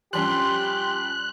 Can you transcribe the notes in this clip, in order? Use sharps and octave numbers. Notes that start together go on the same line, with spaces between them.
F3 G3 C#4 G4 C6 F#6